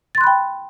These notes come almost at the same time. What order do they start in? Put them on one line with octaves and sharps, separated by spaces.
A6 C6 F#6 B5 G5